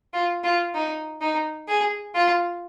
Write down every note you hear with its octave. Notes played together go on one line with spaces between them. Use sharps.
F4
F4
D#4
D#4
G#4
F4